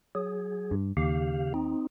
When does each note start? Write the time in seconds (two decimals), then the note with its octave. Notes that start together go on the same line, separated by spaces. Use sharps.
0.15 F#3 G#4
0.71 G2
0.97 D#2 C#3 G4 F5
1.54 C4 D#4